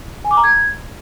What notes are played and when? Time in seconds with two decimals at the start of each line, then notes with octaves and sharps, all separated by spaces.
0.25 G#5
0.31 D6
0.37 A#5
0.44 G#6